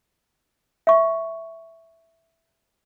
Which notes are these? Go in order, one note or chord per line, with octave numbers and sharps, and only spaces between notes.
E5 C#6